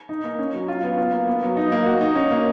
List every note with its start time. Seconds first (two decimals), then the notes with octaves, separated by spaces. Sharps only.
0.09 D#4
0.24 A#3
0.39 C#4
0.53 F#3
0.68 F4
0.83 B3
0.98 F4
1.12 A#3
1.27 B3
1.43 F#3
1.57 D#4
1.72 A#3
1.86 F#4
2.01 D#4
2.15 C#4
2.31 A#3